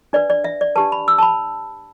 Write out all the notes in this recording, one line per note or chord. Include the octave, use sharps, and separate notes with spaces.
D4 B4 D5
D5
E5
D5
D4 G4 B4 A5
B5
E6
A5
B5